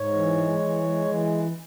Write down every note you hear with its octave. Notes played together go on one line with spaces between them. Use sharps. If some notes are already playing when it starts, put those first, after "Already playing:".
Already playing: G#2 C#5
E3
G#3
E3
G#3
E3